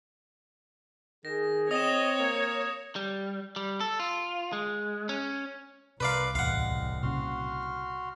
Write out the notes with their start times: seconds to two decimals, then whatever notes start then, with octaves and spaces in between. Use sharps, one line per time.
1.25 D#3 G#4 A#6
1.71 C4 C#5 D#5 D#6 E7
2.20 A#3
2.96 G3
3.56 G3
3.80 A4
4.00 F4
4.53 G#3
5.09 C#4
6.00 C2 C3 A#4 B4 D5 F5 C6
6.35 D1 E2 B2 G#3 F5 F#5
7.02 A#2 C#3 F#4 C6 F6